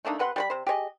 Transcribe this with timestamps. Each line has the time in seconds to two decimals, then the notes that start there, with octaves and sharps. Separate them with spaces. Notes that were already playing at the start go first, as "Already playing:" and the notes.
0.05 A3 A#3 D4 D#4
0.19 C3 B4 F#5 C6
0.36 G3 C5 B5
0.50 C3 C5
0.67 G4 G#4 C#5 D#5